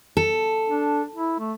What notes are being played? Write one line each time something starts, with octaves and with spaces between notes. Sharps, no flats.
A4
D4
E4
A3